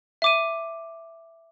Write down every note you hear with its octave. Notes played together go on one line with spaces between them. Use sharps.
E5 D6 D#7